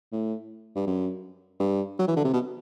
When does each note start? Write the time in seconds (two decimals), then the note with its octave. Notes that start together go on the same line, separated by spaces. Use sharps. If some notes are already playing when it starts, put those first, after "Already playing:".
0.12 A2
0.76 G2
0.87 F#2
1.60 G2
1.99 F#3
2.08 E3
2.16 D3
2.25 C3
2.34 B2